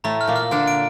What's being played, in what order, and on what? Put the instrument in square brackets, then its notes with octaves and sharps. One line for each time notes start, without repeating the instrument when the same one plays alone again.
[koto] A2 A3 [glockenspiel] A#5
[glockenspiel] F6
[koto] A#2 A#3
[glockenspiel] F6
[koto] D3 D4 [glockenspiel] F6
[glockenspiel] D7